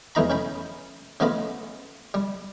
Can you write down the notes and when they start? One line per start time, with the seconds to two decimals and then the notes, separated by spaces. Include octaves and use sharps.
0.15 E2 E3 A3 D#4 A#5 B5
0.30 C#4 G5 B5
1.20 C#3 A3 B3 F4 D#5 B5
2.14 G3